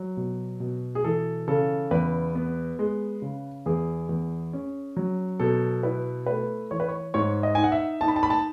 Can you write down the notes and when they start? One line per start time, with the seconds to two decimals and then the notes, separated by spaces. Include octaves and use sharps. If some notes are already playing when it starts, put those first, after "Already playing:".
Already playing: F#3
0.17 B2
0.60 B2
0.95 G#4
1.04 E3 A4
1.48 C#3 A4
1.91 E2 B4
2.35 B3
2.79 G#3
3.22 C#3
3.66 E2 G#4
4.09 E2
4.53 C#4
4.97 F#3
5.40 B2 A4
5.83 E4 B4
6.26 A3 B4
6.71 E3 C#5
6.80 B4
6.88 C#5
7.14 G#2 C#5
7.43 D#5
7.55 D#4 G#5
7.64 F#5
7.72 E5
8.01 D#4 A5
8.08 B5
8.16 A5
8.23 B5
8.30 A5